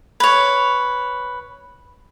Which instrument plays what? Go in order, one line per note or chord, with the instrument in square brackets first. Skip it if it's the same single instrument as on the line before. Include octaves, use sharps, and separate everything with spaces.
[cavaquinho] B4 C#5